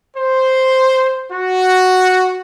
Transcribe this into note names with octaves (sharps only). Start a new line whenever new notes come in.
C5
F#4